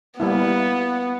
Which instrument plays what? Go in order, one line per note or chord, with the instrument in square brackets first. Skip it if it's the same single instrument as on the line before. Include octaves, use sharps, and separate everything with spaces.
[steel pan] G3 A#3 E4 [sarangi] B3